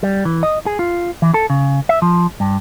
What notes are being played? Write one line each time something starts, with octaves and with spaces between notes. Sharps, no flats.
G3
E3
D#5
G#4
F4
E3
A4
C#3
E5
F3
G2